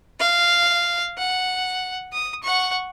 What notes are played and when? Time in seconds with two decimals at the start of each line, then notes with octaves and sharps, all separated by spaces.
0.20 F5
1.18 F#5
2.13 D#6
2.43 F#5 C#6